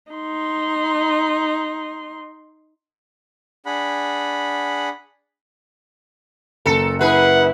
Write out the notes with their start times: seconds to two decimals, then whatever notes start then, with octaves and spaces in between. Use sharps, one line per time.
0.12 D#4 C6
3.66 D4 G#4 F#5 B5
6.66 F#1 A4 A#5 C#7
7.01 E4 G#4 B4 F#5